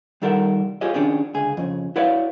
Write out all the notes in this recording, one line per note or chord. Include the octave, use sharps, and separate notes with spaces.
C2 D#3 G3 A4 A#4 F#5
F4 G4 G#4 C#5 D#5
D#3 C#4 D4 G4 G#4
C#2 D3 G#4
F2 C#3
E4 F#4 B4 C#5 D5 F5